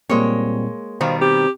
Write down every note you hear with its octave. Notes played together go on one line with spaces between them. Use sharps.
A#2 G3 G#3 A#3 C4 C#5
B2 D#3 G3 C5 F5
C4 G4